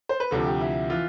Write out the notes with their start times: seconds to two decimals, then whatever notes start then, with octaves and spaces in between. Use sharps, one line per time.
0.09 C5
0.20 B4
0.31 D2 C3 F3 A4
0.46 G4
0.61 E4
0.90 E3 F4